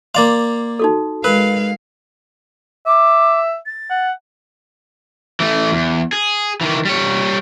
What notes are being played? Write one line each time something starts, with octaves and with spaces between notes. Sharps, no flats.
A#3 D5 F5 C6
D#4 F#4 A4
G#3 A#4 B4 F5
E5 D6
A6
F#5
E3 A3
E2
G#4
D#3 E3
G3 C#5